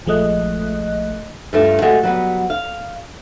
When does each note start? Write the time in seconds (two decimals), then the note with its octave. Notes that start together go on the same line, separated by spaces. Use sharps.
0.06 A#1 F3 G#3 A3 D#5 F#6
1.53 G2 G3 A3 F4 A5
1.82 G#3 A3 F#4 G4 D#5
2.03 F#3 G3 B3
2.50 F5